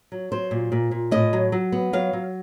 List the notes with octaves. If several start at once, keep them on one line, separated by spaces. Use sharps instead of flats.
F#3
F#3 C5
A#2
A#2
A#2
A2 D#5
F#3
F#3
B3
F#3 F5
F#3